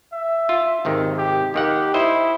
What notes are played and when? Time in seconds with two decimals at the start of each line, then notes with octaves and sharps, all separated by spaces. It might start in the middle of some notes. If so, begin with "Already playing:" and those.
0.13 E5
0.49 F4
0.85 G#1 C3 D#3
1.18 G4
1.54 D#2 D#3 G4 F#5
1.94 E4 C5 D#5